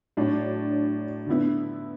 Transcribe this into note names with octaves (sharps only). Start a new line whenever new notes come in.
A2 F#3 D4
D3 B3 E4